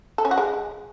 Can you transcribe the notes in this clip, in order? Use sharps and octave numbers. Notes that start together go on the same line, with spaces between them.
A4
C#4
F#4
G#3